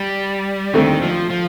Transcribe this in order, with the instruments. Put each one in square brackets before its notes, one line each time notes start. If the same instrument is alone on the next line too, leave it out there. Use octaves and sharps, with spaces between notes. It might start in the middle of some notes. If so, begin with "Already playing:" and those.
Already playing: [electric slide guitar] G3
[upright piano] D#2 D3 A3 C4 [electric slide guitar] D#3
[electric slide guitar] F3
F3